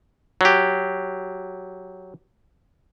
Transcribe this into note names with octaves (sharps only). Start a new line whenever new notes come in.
F#3 G4